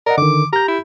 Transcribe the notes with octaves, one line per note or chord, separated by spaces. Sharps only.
A#4 D5 D#5 F#5
D3 D#3 D6
G4 A#5 G6
E4